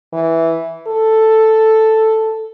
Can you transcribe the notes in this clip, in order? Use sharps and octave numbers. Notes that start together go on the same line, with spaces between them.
E3
A4